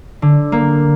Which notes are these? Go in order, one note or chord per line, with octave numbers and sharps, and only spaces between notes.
D3
A#3